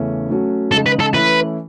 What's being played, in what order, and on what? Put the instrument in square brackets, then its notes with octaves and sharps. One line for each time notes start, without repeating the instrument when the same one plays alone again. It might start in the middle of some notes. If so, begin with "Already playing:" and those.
Already playing: [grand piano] E2 C#3 E3 A3 C#4
F#3 A3 C#4 F#4
[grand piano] C#3 G#3 D#4 [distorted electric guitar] A4
[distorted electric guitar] B4
A4
[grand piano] E3 A3 C#4 E4 [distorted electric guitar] B4